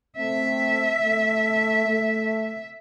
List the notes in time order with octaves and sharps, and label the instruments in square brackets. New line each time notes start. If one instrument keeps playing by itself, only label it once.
[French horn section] A3 C4 [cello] E5
[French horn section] A3
A3